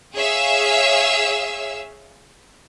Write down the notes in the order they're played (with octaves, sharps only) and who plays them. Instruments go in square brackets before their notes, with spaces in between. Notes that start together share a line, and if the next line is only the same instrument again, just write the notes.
[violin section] G#4 C#5 E5 F5 E6